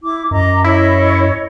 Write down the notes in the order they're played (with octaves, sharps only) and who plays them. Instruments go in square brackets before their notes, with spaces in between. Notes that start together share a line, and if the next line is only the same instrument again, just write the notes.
[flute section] E4 D6
[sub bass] F#2 [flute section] D#5 A#5 D6
[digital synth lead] E4 [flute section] C#5 D#5